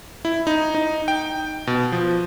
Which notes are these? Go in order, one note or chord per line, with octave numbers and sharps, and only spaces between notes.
E4
D#4
D#4
G5
B2
F3